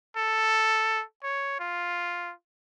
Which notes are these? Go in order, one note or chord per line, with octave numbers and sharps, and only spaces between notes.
A4
C#5
F4